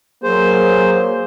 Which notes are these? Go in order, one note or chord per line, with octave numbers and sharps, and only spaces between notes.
F#3 A#3 G#4 C5